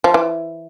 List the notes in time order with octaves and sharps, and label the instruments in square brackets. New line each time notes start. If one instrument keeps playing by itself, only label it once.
[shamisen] F3
E3